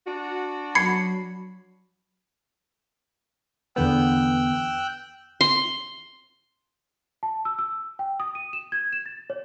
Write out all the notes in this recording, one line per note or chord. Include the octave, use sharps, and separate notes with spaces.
D4 F#4
F#3 B5 G#6 C7 C#7
E2 D3 B3 G5 E6 F#6
C6
A5
E6
E6
G5
D#6
D#7
E7
G#6
E7
A6
C#5